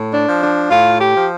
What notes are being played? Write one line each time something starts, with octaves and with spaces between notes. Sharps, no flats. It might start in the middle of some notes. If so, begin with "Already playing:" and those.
Already playing: A2
D4
F3
D4
A2 F4
G4
F3